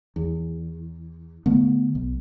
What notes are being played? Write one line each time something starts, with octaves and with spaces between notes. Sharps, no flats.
E2
D3 A3 B3
B1